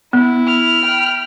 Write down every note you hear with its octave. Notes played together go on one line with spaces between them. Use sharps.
B3 E4
B5 F6
G5